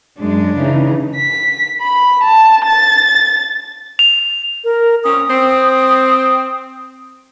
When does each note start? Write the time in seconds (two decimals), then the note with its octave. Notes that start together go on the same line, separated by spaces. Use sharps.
0.19 F#2 G#3 D4
0.57 C#3 E3 D#4
1.16 B6
1.82 B5
2.23 A5
2.66 A6
3.99 F7
4.64 A#4
5.04 A#2 C4 C#4 D#6
5.29 C4